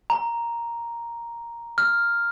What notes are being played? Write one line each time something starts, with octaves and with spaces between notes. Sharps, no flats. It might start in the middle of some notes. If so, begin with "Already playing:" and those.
A#5
F6